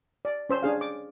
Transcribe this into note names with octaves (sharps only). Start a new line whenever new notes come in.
D5
C#4 C5 E6
D4 G#4 F5
D6